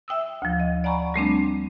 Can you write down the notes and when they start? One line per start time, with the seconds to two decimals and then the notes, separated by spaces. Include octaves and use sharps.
0.08 E5 G5 D#6 E6
0.42 D2 F3
0.60 D#5
0.84 D5 F#5 G#5 A#5 B5 C#6
1.14 G3 A3 C4 D4